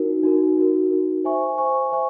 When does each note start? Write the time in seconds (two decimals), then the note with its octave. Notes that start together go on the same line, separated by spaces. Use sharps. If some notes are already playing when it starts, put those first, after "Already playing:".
Already playing: D#4 F#4 A#4
0.24 D#4 F#4 A#4
0.57 D#4 F#4 A#4
0.91 D#4 F#4 A#4
1.24 C5 E5 G#5 C#6
1.58 C5 E5 G#5 C#6
1.92 C5 E5 G#5 C#6